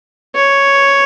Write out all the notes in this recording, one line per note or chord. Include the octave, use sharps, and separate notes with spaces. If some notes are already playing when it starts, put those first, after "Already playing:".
C#5